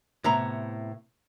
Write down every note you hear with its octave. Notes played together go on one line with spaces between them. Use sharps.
A2 C3 B3 A#5